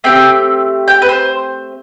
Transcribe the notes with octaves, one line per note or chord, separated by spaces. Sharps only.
A3 C4 G4 G5
G5
B4
C5